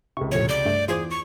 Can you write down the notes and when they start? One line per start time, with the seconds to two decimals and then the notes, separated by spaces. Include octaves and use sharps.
0.17 C#2 C3 C#6
0.32 A#1 F2 A2 C#5
0.49 D5 G6
0.65 G2 A3
0.88 E2 F4 G#4 C5 D6
1.10 C#6